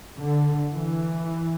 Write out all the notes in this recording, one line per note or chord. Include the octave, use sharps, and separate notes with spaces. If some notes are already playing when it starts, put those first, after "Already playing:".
D3
E3